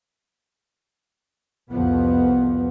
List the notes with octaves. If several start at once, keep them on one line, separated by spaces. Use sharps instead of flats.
C2 F2 F3 B3